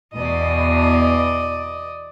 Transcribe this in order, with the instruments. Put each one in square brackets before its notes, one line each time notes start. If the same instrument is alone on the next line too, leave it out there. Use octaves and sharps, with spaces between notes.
[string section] E2 B2 [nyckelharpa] D5 D#5